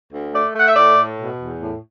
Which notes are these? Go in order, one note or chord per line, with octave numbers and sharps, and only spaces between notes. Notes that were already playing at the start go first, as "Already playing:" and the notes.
D2
A3 D5
A3 F#5
E5
A2 D5
A2
B2
E2
A2